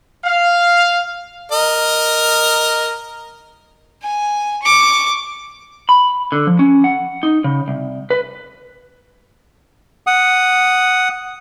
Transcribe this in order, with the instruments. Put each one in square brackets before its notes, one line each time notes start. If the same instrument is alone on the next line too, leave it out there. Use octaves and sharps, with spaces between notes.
[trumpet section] F5
[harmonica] A#4 D#5
[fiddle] G#5
C#6 D6
[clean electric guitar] B5
D3
F3
C#4
F#5
D#4
C#3
C2
B4
[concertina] F#5 D#6